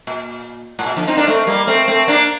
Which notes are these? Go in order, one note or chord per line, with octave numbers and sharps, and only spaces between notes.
A#2
A2
A#2
D3 F3
C4 D#4
A#3 D4
A3 C4
G3 A#3
A3 C4
A3 C4
A#3 D4